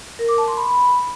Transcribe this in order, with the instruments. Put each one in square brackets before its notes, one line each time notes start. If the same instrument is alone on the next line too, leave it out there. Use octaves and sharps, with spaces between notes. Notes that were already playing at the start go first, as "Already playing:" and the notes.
[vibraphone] A#4
D6
A5
C6
B5